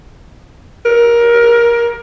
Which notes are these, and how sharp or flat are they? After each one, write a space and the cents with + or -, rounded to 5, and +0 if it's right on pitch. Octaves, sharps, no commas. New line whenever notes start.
A#4 +20